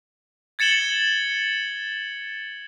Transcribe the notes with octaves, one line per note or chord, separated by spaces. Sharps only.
G#6 A6 C#7 E7 F#7 G7